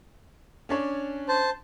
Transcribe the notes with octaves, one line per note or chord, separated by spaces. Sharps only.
C#4 D4 C#5
C5 A5